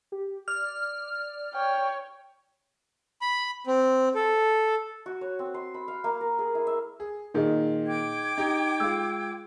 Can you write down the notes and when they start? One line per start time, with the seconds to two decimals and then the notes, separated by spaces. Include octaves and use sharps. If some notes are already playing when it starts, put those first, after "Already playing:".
0.12 G4
0.48 D5 F6
1.54 C#5 G5
3.22 B5
3.67 C4
4.15 A4
5.06 F#4
5.21 C#5
5.39 C4
5.54 C6
5.74 B5
5.88 F5
6.04 A#3
6.21 A#4
6.39 G#4
6.55 E4
6.67 E5
7.00 G#4
7.34 A#2 D#3 D#4 G#4 D#5
7.87 G5 D6 G#6
8.38 D#4 G4
8.80 G#3 F4 E6